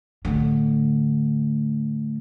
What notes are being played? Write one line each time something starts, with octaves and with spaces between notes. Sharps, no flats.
A2 D3